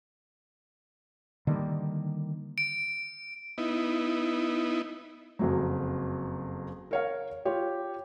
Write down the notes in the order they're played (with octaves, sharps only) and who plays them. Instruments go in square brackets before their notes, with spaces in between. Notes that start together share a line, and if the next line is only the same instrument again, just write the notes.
[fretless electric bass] D3 D#3 G3 A#3
[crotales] D7
[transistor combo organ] B3 D#4 E4
[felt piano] F#1 F2 F#3
A#4 C#5 F5
F4 G4 C#5